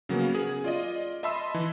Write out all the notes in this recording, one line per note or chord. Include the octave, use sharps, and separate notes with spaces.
C#3 F#3 A#3 B3 C#4
G#4
F4 D5 D#5
D#5 E5 A5 B5 C6 E6
E3